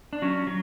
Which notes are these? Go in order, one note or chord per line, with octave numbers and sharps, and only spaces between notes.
D4
F#3 C#4
F#3